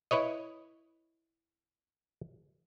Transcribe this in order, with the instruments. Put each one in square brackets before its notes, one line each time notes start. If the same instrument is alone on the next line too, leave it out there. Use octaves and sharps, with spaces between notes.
[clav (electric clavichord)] E4 B4 C#5 D#5